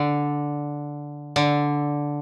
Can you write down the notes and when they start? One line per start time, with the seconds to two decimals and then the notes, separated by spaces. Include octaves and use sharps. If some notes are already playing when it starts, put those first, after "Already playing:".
Already playing: D3
1.36 D3